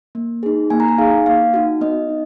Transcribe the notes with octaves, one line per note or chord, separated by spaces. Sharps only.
A#3
D#4 G#4
A#3 G#5
A#5
G#5
D#4 G#4 F5
A#3 F5
D#4 F#4
B3 D#5
D#4